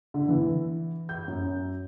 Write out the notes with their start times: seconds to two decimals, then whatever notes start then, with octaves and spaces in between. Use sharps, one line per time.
0.14 D3
0.29 E3
1.09 G6
1.28 F#2